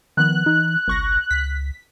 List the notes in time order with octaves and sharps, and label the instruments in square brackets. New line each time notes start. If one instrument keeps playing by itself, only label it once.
[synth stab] D#3 B3 [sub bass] F3 [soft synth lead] F#6
[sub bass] E3 [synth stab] D#4
[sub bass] G1 [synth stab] C2 C#6 A#6
[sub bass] C#2 [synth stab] B6